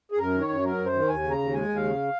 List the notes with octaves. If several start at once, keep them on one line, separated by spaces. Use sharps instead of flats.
G#4
F#2 A#4
D#3
C#5
F#2
F#3 A#4
F#2
C5
D#3
D#2 G#5
C#3
A#5
D#2
G#3 G#5
D#2
F5
C#3